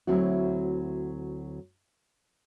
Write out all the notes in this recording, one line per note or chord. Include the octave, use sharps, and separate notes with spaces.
D2 F#3 C4 E4 F#4